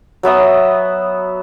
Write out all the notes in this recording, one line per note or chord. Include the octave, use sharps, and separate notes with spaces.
F#3 B3 E5 D#6